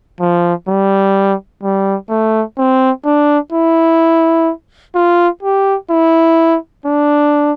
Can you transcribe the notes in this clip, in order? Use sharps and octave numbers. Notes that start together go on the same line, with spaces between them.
F3
G3
G3
A3
C4
D4
E4
F4
G4
E4
D4